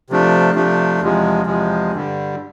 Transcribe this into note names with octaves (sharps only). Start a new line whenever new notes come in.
C3 F3 A3 D4
C3 F3 A3 D4
E2 C3 F3 G#3
E2 C3 F3 G#3
G2 D3 G3